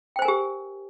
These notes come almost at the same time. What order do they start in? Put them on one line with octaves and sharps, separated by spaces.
G5 C5 G#5 A#4 G4